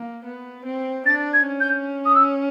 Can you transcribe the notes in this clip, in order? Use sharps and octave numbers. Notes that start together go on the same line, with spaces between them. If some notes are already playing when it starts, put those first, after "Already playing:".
Already playing: A#3
B3
C4
D4 A6
G#6
C#4
G6
D#6
E6